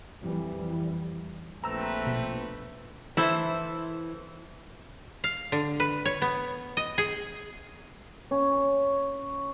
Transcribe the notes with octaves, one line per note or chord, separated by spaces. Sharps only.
F2 E3 G3
A#1 A3 C4 B4 A#5 E6
B2
E3 E4 A4 C5
F5
D3
B4
C#5
B3
D#5
G#4
C#4